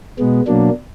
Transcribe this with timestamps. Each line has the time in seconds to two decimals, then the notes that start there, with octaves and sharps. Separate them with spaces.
0.19 B2 G#3 B3
0.47 B2 F#3 A#3 D4